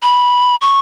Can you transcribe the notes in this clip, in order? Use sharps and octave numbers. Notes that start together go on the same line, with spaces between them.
B5
C#6